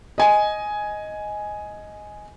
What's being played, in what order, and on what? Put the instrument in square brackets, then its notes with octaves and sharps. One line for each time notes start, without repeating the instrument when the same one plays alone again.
[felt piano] D#5 G#5